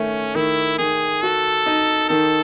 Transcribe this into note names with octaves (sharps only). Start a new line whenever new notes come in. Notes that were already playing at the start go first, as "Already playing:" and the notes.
Already playing: D#3 A3 C#4
D#3 E4
D#3 G#4
F#4 A4
D#4
D#3 A4